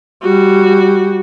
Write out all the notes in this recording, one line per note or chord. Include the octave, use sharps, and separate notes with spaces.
G3 F#4